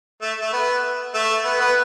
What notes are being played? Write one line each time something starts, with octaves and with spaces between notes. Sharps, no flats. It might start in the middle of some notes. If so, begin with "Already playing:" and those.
A3
A3
B3
A3
B3
B3